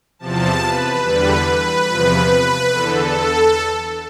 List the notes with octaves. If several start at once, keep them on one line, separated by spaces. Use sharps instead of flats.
E2 C3 F3 A5
B4
E2 D3 G3 B4
B4
E2 C3 F3
E2 D3 A4